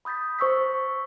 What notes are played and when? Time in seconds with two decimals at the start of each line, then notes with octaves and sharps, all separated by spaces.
0.05 B5 D#6 G6 A6 B6
0.39 C5 C#6 E6 B6